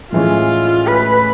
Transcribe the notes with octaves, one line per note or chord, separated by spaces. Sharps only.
A2 E3 G#3 C#4 F4
B4